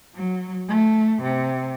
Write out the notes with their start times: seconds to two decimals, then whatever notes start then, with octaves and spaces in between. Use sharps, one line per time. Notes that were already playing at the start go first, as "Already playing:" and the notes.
0.15 F#3
0.69 A3
1.22 C3